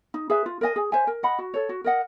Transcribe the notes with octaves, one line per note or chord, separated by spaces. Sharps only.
D#4
G#4 B4 E5
F4
A#4 D#5 G#5
G#4
C5 E5 G#5
A#4
D#5 F#5 B5
F#4
A4 C#5
F#4
A#4 D#5 F#5